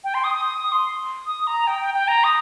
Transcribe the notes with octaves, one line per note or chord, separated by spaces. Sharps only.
G5
C6
D#6
D#6
D#6
D#6
C6
D#6
A#5
G5
G5
G5
A#5
D#6